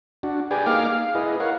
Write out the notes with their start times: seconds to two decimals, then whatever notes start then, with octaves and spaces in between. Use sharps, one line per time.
0.23 D4 F#4
0.51 G4 G#4 B4 D5 G5 G#5
0.66 A#3 D#4 G#4 F5 D6 F6
0.95 F5
1.15 E4 G#4 B4 D#5
1.40 A#4 C#5 F5 F#5